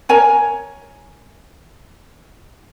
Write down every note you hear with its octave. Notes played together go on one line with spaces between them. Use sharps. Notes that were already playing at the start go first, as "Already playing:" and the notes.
A#4 C#5 G#5 A#5